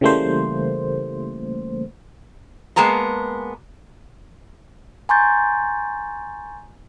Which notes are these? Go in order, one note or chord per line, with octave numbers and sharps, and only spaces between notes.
C#3 E3 G3 A3 A#3 C5
G#3 A#3 B3 A5 A#5
G#5 A#5 C6 C#6 G6 A6